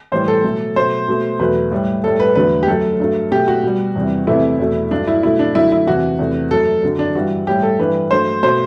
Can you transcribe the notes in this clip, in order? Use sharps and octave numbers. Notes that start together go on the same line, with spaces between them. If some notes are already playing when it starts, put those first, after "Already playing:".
A2 E3 G3 C5
A4
B2 F#3 A3
B2 F#3 A3 C5
B2 A3
E2 B2 F#3 A3 B4
A2 G3
A2 G3 A4
B4
E2 D3 F#3 A3 B4
G4
F#2 F#3 A3 A4
G2 F#3 A3
B2 F#3 A3 G4
F#4
B2 G3
E2 C3 E3 G3
E2 C3 E3 A3 E4
E2 B2 A3
G2 F#3 A3 D4
E4
B2 F#3 A3 E4
D4
F#2 D3 A3 E4
E4
E2 C3 E3 F#4
E2 C3 E3 A3
F#2 F#3 A3 A4
F#2 D3 F#3
D4
G2 E3 G3 F#4
A2 G3 G4
A4
G2 E3 G3 B4
G2 F#3 A3 C5
B2 A3 C5